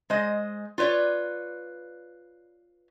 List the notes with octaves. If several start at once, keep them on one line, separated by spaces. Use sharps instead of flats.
G#3 C5 D#5
F4 B4 C#5 D5